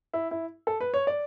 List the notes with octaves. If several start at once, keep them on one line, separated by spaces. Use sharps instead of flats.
E4
E4
A4
B4
C#5
D5